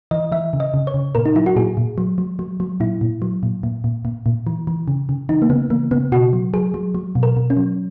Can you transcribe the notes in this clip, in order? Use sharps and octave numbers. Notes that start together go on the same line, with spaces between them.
E3 D#5
E3 E5
C#3
D#5
C#3
C#5
C#3
A#2 A#4
D#4
F#3 E4
F#4
A#2 G#4
A#2
F#3
F#3
F#3
F#3
A#2 E4
A#2
F#3
A#2
A#2
A#2
A#2
A#2
E3
E3
C#3
C#3
E3 D#4
A#3
C#3 B3
E3 A#3
C#3 B3
B2 F#4
F#3
F#3 G#4
F#3
F#3
B2
A#4
B2
C#4
F#3